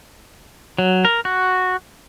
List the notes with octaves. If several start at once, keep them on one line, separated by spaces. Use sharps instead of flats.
F#3
A#4
F#4